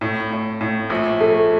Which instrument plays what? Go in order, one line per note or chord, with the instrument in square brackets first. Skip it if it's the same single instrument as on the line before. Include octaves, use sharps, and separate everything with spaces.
[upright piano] A2
A2
A2
A#1
A3